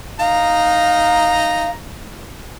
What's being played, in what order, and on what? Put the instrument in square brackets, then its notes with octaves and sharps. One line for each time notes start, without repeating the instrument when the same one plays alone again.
[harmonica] D#4 A#5 [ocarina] F5